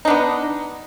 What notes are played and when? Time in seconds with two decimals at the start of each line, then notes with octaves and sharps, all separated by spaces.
0.05 D#4
0.08 D4
0.10 B3